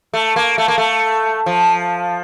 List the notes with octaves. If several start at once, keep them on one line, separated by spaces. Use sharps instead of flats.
A3
A#3
A3
A#3
A3
F3